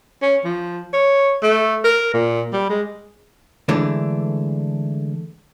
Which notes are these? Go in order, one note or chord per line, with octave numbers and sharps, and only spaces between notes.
C#4
F3
C#5
A3
A#4
A#2
G3
G#3
D3 E3 G#3 A3 D4